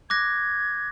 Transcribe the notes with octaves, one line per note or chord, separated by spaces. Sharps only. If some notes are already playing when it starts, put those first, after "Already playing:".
D6 F#6 G#6 A#6